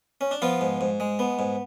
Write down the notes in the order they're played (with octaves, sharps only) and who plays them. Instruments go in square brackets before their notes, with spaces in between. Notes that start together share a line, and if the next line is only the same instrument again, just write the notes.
[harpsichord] C#4
D4
F3 B3 F4
G#2
G#2
G#3
B3
G#2